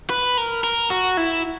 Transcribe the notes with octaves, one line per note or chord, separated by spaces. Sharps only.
B4
A#4
A#4
F#4
E4